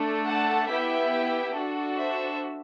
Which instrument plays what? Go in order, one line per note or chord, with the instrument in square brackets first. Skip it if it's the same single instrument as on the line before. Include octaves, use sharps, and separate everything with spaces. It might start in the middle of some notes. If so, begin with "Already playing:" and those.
Already playing: [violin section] A3 D4 A4
F#5 A5
B3 E4 G4 E5 G5
D4 F#4 A4
C5 E5